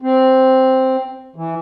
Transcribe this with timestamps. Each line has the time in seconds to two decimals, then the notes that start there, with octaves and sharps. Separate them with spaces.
0.02 C4
1.36 E3